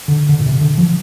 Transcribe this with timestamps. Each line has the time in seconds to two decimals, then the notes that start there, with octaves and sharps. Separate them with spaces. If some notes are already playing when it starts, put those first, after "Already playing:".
0.08 D3
0.29 D3
0.40 A#2
0.46 C3
0.61 D3
0.78 F3